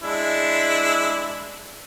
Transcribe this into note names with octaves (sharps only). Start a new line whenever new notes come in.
G#3 D4 E4